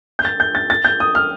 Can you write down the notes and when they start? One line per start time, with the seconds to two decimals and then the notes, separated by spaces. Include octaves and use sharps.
0.19 G6
0.25 A6
0.40 G6
0.55 A6
0.70 A6
0.85 G6
1.00 D#6
1.15 F6